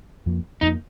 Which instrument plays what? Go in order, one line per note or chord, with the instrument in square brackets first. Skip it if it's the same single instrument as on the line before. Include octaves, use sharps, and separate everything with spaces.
[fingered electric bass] F2 F3 A#3
[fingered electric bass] F2 F3 A#3 [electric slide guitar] D#4